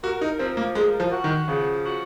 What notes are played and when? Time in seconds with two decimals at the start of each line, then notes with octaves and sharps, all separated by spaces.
0.04 F#4 A#4
0.21 D#4
0.39 F3 C4
0.57 A#3
0.75 G#3 A#4
1.00 F3
1.12 F#4
1.24 D#3
1.48 C#3 F3
1.85 F#4